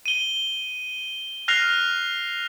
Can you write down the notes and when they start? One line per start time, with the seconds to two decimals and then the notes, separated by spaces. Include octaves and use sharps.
0.06 D#7 G7
1.48 F6 F#6 A#6 C7 F7